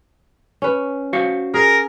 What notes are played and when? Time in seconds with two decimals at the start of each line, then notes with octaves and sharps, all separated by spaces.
0.62 C#4 B4
1.13 F#4 C5 F5
1.54 G#4 A#4